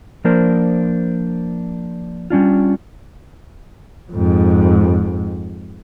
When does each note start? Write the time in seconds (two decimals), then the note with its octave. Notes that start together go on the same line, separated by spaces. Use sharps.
0.24 F3 A#3 D4 A#4 C5
2.30 G3 C#4 D4 F4
4.12 F2 G#2